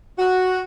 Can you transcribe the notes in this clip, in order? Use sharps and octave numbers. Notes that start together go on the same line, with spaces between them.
F#4